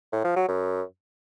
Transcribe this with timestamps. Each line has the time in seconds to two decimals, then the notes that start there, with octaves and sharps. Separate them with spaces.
0.12 A2
0.24 F3
0.36 F#3
0.48 F#2